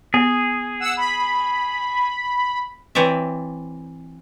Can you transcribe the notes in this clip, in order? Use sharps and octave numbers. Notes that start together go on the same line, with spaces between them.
B3 G#4
F#5 E6
B5
E3 C4 C#5 D5 E5